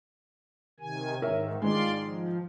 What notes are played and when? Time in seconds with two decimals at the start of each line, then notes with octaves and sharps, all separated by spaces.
0.80 C3 D#3 G#5
1.22 G#2 D#3 A#4 C#5 E5
1.62 G#2 D#3 G#3 F4 D5 C6
2.05 F3